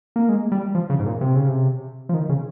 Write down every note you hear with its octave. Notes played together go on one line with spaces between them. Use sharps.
A#3
G#3
G3
F3
C#3
G#2
A#2
C3
C#3
C3
F3
D#3
C#3